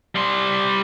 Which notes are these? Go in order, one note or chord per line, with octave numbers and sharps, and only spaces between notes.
G3 C6